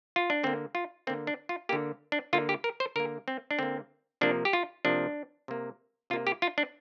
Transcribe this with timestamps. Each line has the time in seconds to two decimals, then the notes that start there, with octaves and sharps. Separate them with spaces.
0.16 F4
0.30 D4
0.43 D3 A#3 C4
0.75 F4
1.07 D3 A#3 C4
1.27 D4
1.49 F4
1.69 D3 A#3 G4
2.12 D4
2.33 D3 A#3 F4
2.49 G4
2.64 A#4
2.80 C5
2.96 D3 A#3 A#4
3.28 C4
3.51 D4
3.59 D3 A#3 C4
4.21 C3 F3 A#3 D4
4.45 G4
4.53 F4
4.85 C3 F3 A#3 D4
5.48 C3 A#3
6.10 C3 A#3 F4
6.27 G4
6.42 F4
6.58 D4